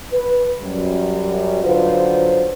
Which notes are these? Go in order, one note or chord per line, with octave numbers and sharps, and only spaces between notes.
B4
F#2 G3
D3 F#3 F4 B4 C5